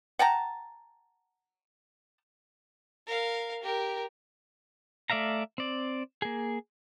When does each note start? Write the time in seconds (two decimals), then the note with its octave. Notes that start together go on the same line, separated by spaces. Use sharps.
0.19 F#5 G5 A5 A#5
3.07 A#4 F5
3.63 G4 A#4
5.10 A3 D5 E5 F5 A#5
5.58 C4 D5
6.22 A#3 G#4